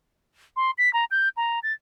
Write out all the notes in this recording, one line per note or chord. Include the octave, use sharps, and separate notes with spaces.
C6
B6
A#5
G6
A#5
A6